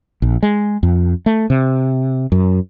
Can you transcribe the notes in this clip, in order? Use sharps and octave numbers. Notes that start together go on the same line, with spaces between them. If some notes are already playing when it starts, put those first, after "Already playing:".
A#1
G#3
F2
A3
C3
F#2